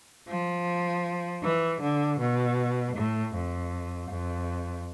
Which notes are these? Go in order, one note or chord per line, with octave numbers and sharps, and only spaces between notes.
F3
E3
D3
B2
A2
F2
F2